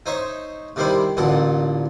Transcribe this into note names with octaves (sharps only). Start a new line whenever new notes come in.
D#4 C5 C#5 E5
C3 D#3 G3 E4 C5
A1 D2 A#2 A4 F#5